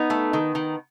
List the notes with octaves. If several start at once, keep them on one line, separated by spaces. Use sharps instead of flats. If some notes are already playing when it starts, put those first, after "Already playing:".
Already playing: B3 D#4
A3
D#3
D#3